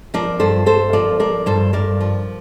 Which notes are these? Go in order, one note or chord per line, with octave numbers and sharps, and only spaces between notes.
F3 A#4 D5
G2 A4 C5
G2 A4 C5
F3 A#4 D5
F3 A#4 D5
G2 A4 C5
G2 A#4 D5
F3